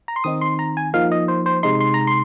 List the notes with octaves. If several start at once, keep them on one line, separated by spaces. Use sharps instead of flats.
A#5
C6
D#3 C4 D#4 D#6
C6
A#5
G#5
F3 A#3 D#4 F5
D#5
C5
C5
C3 G#3 D#4 C6
C6
A#5
C6